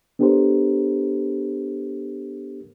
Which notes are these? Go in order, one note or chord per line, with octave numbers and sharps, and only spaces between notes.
B3 D4 G4 A4 A#4 C5